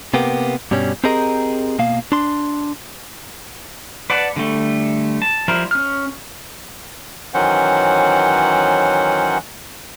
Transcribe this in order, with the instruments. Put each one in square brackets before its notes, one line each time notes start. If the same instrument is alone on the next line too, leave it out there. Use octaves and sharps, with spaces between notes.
[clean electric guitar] C3 A#3 B3 G4
G2 B2 G3 C#4
C4 G4 G#4 A#4 D#5 A#5
B2 A#3 F5
D4 C6
[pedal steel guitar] B4 D5 F#5 A5
D3 G3 A3
A5
F3 G3 E4 A#4 C5
C#4 F6
[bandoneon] D#3 E3 F#3 C#4 C5 F#5